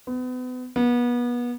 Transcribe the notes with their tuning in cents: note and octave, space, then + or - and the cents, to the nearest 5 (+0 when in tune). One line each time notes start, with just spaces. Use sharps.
B3 +35
B3 -30